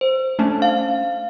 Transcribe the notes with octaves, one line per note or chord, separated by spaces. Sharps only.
C5
A3 C#4 D4
F5